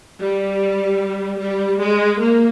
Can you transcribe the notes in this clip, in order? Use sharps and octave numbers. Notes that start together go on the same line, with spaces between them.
G3
G3
G#3
A#3